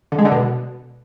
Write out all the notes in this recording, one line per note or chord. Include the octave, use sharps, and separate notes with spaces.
D3
G#3
D3
B2